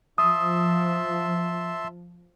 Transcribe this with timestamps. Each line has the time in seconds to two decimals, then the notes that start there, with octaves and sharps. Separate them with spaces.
0.18 F3 E5 A5 C6 D#6